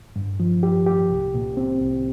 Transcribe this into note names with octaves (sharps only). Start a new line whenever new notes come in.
G2
F3
G4
G4
C2
A#2
C4
C2